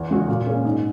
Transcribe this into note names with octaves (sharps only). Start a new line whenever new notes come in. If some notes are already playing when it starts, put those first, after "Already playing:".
Already playing: E2
C#3 G#3 C#4 F#4
A#2
A#3 C#4 G#4
G#2